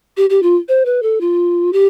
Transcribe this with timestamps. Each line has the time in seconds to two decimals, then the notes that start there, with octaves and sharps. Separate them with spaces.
0.17 G4
0.30 G4
0.43 F4
0.68 C5
0.85 B4
1.03 A4
1.21 F4
1.73 G4